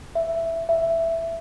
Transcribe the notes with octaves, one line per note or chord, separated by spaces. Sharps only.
E5
E5